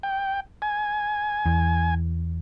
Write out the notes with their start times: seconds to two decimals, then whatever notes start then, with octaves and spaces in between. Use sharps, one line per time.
0.03 G5
0.62 G#5
1.46 E2